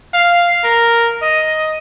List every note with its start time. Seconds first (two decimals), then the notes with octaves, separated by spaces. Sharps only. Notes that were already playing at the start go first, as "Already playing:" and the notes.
0.14 F5
0.64 A#4
1.22 D#5